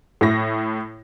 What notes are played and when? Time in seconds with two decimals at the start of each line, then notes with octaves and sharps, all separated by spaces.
0.21 A2 E4 C#6 A#6